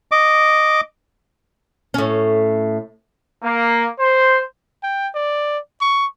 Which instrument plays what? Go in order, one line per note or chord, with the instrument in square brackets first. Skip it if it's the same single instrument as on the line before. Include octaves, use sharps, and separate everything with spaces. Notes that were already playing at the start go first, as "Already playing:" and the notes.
[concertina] D#5 D6
[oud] A2 C#4
[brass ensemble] A#3
C5
[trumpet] G5
D5
C#6